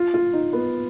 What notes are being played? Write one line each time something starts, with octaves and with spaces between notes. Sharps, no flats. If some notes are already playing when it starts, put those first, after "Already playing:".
Already playing: F4
F4
D#4
B3